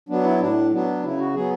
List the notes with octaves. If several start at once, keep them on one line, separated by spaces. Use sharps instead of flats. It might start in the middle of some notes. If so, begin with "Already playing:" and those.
F#3 B3 D4
E4
A2 D4
F#3 B3 D4
C#3 E4
F#4
F#3 B3 G#4